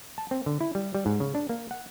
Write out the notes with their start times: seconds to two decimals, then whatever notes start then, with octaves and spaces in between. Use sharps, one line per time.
0.18 A5
0.31 C4
0.46 D3
0.61 E4
0.75 G3
0.95 G3
1.06 G#2
1.20 C#3
1.35 D4
1.49 A#3
1.71 F#5